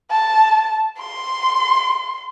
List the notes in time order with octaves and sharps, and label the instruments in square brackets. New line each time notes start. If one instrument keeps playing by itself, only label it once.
[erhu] A5
C6